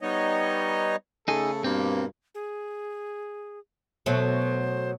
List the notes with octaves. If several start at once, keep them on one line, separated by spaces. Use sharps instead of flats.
G3 B3 D#4 C#5 D#5
C#3 A3 D#4 G#4 A4
G2 B2 A#3 C4
G#4
B2 F#3 A3 C5